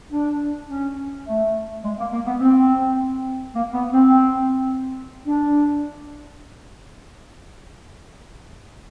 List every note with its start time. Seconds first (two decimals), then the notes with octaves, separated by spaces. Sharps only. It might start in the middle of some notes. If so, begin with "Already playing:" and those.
0.12 D4
0.69 C#4
1.26 A3
1.84 G#3
1.98 A#3
2.13 A#3
2.26 B3
2.40 C4
3.55 A#3
3.73 B3
3.94 C4
5.27 D4